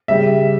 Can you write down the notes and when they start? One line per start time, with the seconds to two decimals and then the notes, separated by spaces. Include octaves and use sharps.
0.08 C#3 G3 E5